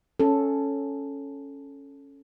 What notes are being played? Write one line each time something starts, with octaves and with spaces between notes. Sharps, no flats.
C#4 A4